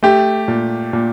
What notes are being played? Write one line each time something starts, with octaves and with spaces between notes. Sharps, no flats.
A3 G4
A#2
A#2